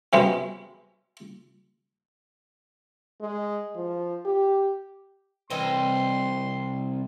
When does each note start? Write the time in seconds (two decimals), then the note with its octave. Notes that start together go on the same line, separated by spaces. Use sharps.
0.13 C3 F#3 G#3 B3 C#4
3.21 G#3
3.76 F3
4.25 G4
5.50 C2 E3 C4 D#5 C6